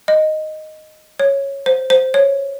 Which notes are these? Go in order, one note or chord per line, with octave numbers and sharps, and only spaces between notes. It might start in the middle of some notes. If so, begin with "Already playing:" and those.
D#5
C#5
C5
C5
C#5